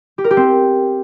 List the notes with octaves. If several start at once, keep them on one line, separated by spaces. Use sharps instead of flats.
G4
A#4
G4
C4